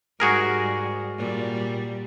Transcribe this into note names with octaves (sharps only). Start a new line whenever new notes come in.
G#2 G3 F#4 G#4 A#4
A#2 G3